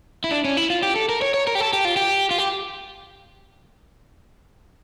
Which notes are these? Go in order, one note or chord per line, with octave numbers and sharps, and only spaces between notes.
E4
D4
C#4
E4
F4
G4
A4
A#4
C#5
C#5
A#4
G4
A4
G4
F4
G4
F4
G4